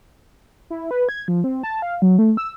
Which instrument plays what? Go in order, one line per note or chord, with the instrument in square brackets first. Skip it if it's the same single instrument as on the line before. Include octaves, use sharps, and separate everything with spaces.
[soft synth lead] E4
B4
G#6
F3
C4
A5
F5
F#3
A3
E6